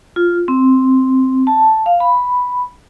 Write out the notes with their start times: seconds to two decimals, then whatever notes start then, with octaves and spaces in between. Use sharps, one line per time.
0.16 F4
0.48 C4
1.47 A5
1.86 F5
2.00 B5